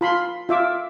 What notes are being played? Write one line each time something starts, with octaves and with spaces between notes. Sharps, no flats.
F4 B5 C6
F4 E5 D6